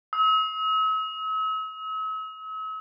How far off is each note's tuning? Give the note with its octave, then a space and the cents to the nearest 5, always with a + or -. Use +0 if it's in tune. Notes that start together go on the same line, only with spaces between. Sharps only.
E6 -45